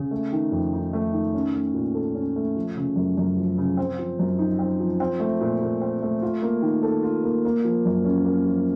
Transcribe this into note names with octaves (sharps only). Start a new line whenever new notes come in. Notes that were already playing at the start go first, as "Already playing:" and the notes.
Already playing: C#3
A3
D#3
F2
D#4
A3
D#3
C#4
A3
A#2
A4
C#4
A3
F3
C#3
F#2
F#2
F3
C#3
C4
F3
F#2
D#4
C4
F3
C4
A3
A#2
A#2
C4
A3
F4
A#3
D#3
A4
F4
A#3
A#3
F3
F#2
C#4
A#3
F3